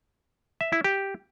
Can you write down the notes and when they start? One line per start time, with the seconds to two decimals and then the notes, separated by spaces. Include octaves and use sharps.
0.61 E5
0.72 E4
0.84 G4